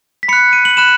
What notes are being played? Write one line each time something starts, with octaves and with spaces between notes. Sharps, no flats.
B6
B5 F#6 C#7
D#7
F#7
B5 F#6 E7